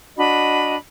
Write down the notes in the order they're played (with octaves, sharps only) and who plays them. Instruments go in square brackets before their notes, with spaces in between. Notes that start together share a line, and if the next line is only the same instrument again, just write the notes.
[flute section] D4 F#4 D#5 B5